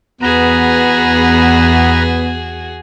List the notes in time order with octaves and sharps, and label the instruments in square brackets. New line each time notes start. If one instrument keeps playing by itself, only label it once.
[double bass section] E2 [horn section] B3 [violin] F#4 G#4 [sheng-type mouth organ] B4 A#5